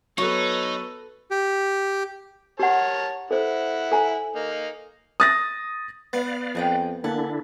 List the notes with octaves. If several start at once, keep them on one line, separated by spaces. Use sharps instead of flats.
F#3 B3 D#4 A4 B4 C#5
G4
G4 A#4 C#5 F#5 A5
E4 A4 C5 F#5
A4 G#5 A#5
A#3 D#4
D#6 A6 A#6
B3 B4 D5 F5
F2 G#4 D#5 G5
D3 A#3 D4 E4 F#5 G#5 A5